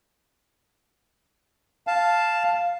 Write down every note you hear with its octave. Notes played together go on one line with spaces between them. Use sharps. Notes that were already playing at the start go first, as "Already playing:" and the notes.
F5 A5